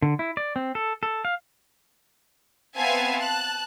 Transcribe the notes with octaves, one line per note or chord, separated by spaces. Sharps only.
D3
E4
D5
C4
A4
A4
F5
B3 C4 E5 F5 G#5 A5
A5 F#6